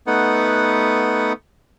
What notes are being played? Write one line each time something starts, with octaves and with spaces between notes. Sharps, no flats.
A3 B3 D#4 B4 F#5